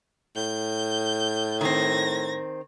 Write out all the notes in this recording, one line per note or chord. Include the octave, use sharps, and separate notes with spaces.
A2 G6
D#3 C4 G#6 A#6